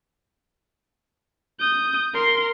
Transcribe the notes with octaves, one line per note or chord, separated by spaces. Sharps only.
D#6 G6
A#4 C6